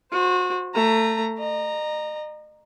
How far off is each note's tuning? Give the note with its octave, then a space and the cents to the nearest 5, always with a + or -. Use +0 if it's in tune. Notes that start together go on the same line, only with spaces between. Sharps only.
F#4 -30 C5 +0
A3 +20 A#5 +0
D#5 -40 A#5 +0